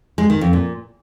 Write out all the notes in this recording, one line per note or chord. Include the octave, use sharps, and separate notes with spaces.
G#3
D#3
F2
A#2